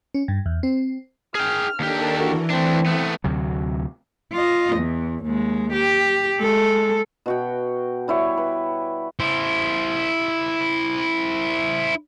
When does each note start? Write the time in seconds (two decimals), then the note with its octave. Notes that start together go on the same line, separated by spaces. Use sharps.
0.14 C#4
0.28 G2
0.46 E2
0.63 C4
1.35 G#4 G5 F6
1.80 D#2 D4 G4 A4 A#4
2.19 E3 F#4
2.50 A3 C4 D4
2.86 A3 B3
3.24 D2 C3 F#3
4.33 F4 D#5
4.76 E2
5.24 D#2 G#3
5.72 G4
6.38 G#3 A4
7.26 B2 F#4 G5
8.08 G3 E4 C#5
8.38 B4
9.20 E4 C5